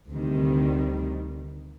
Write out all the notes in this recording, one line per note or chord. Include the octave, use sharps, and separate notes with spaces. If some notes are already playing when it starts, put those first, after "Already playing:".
D2 C3 D#3 G3